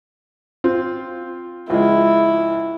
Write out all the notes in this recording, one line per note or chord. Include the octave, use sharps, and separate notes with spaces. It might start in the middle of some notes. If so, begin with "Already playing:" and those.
C4 F4
C#2 F3 G#3 E4